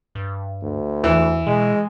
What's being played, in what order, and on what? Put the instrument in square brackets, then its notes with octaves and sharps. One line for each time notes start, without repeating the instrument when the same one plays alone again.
[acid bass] G2
[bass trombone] D2
[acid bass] E2 [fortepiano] E3
[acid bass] B2 [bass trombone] G#3